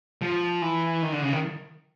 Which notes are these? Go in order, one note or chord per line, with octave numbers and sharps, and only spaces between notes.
F3
E3
D#3
D3
C#3
D#3